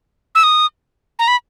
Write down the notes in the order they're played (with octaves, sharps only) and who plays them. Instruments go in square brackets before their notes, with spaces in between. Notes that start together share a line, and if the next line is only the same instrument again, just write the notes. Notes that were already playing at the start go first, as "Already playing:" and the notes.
[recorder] E6
D#6
A#5
B5